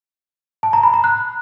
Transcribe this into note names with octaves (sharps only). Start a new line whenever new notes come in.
A5
A#5
B5
A#5
F#6